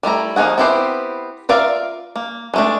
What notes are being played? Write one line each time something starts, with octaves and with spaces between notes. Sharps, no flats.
G3 A3 E4 A#5
F3 A#3 D#4 G#4 F#5
B3 C4 E4 G4 C5
F4 A#4 D5 E5 F5
A#3
G#3 A3 D4